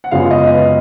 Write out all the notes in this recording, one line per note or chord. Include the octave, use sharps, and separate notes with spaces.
F#5
F#2 C#3 G#3 B3 F4 F5
D#5
B4